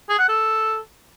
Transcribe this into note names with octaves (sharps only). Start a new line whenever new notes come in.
G#4
F#5
A4